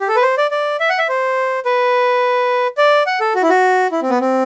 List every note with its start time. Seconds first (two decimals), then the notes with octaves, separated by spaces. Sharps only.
0.01 G4
0.08 A4
0.16 B4
0.22 C5
0.38 D5
0.51 D5
0.80 E5
0.90 F#5
0.99 E5
1.09 C5
1.65 B4
2.78 D5
3.07 F#5
3.21 A4
3.35 F#4
3.42 E4
3.49 F#4
3.92 E4
4.02 C4
4.10 B3
4.20 C4